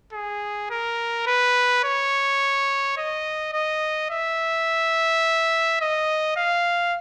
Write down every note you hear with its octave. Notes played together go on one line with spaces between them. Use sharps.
G#4
A#4
B4
C#5
D#5
D#5
E5
D#5
F5